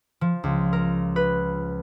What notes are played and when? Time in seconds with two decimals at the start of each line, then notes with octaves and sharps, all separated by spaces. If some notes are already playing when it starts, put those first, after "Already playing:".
0.21 F3
0.44 C#2
0.73 A#4
1.16 B4